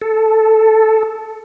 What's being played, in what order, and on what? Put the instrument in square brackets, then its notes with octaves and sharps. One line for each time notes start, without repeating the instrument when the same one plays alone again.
[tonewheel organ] A4